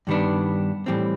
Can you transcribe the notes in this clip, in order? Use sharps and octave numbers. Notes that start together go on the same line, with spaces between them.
G2 D#3 G3 B3 D4
A2 E3 G3 C4